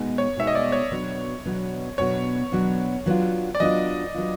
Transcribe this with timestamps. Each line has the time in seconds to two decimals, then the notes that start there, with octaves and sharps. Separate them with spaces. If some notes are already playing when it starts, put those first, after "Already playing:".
Already playing: B2 G#3 B3 D#4
0.18 C#5
0.37 B2 G#3 B3 D#4 E5
0.47 D#5
0.55 D5
0.72 C#5
0.91 B2 F#3 B3 D4
1.45 B2 F#3 B3 D4
1.98 B2 F#3 B3 D4 C#5
2.52 B2 F#3 B3 D4
3.06 F#3 B3 D4 F4
3.55 D5
3.60 F#3 B3 D4 F4 D#5
4.14 F#3 B3 D4 F4